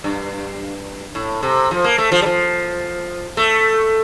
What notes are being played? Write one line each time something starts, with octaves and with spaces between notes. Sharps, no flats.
G2
A2
C3
F3
A#3
A3
F3
G3
F3
A3